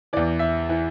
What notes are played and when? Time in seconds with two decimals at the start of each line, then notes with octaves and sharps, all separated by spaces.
0.13 E3 D5
0.17 E2
0.39 E5
0.69 E3